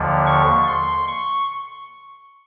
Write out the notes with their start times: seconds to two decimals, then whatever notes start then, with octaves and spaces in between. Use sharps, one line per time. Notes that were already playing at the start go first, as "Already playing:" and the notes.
Already playing: D#2 D3 F3
0.27 C#6
0.68 C6
1.08 C#6